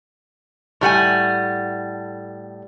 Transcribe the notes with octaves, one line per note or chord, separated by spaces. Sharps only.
A2 G3 F#5 G#5